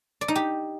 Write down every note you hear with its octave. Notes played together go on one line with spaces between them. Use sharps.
D5
D#4
G4